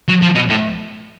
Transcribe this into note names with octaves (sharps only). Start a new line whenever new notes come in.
F#3
F3
B2
A2